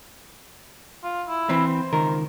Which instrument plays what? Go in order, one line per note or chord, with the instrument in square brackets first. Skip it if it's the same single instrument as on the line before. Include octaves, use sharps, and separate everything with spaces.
[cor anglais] F4
E4
[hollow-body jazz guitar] E3 C4 B4
[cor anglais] C5
[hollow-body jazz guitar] C#2 D#3 A#4